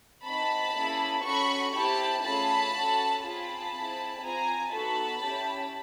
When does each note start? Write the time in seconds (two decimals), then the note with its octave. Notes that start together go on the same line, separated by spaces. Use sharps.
0.24 C4 D#4 F#4 A5 B5
0.74 A#3 C#4 E4 G#4
1.24 C#4 F#4 A4 B5 C#6
1.73 C4 E4 G4 A5 B5
2.23 A3 C#4 F4 G#4 A5 B5
2.73 C#4 F#4 A4
3.23 C4 F4 G#4 A5 B5
3.72 C4 E4 G#4
4.21 C4 F4 G#4 G#5 A#5
4.71 B3 D#4 F#4 A4 A5 B5
5.21 C#4 E4 G4